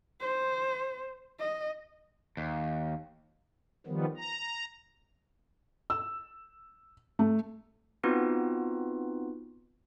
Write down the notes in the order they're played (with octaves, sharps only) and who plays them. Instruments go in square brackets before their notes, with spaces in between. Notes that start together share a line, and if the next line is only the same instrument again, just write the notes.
[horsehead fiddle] C5
D#5
[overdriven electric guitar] D#2
[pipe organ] D#3 F3 G3 B3
A#5
[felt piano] E6
A3
[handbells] B3 C4 D#4 F4 F#4 B4